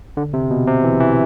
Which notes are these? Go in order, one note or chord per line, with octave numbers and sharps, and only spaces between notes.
D3
C3
B2
C3
E3
E3